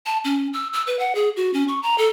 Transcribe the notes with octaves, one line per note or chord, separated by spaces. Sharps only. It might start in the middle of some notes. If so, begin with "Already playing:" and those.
A5
C#4
E6
E6
B4
F#5
G#4
F#4
C#4
C#6
A#5
A4